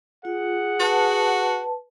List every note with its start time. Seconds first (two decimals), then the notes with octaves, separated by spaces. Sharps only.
0.25 F4 G#4 F#5
0.80 F#4 B4 A5